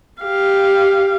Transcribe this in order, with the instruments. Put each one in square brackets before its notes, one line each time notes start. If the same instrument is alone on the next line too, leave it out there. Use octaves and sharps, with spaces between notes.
[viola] G4 F5